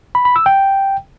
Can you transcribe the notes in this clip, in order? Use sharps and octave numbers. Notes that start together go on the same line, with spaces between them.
B5
B5
E6
G5